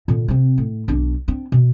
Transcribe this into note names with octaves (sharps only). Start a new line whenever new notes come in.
A#2 D3
C3 C4
A2
B1 D4
C4 D4
B2